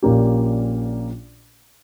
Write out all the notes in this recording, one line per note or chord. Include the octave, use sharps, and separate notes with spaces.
A#1 A#2 A#3 C#4 G4